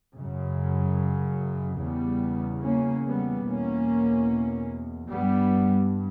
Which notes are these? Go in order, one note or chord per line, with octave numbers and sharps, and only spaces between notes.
F#2 C#3
E2 C#3 G3 B3
A#3 C#4
G3 B3
E2 B2 A#3 C#4
G2 G3 B3